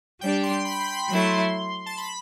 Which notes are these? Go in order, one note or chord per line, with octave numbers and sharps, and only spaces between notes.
G3 D4 G4 G5
C6
B5
C6
B5
F#3 A3 E4 C6
A5
B5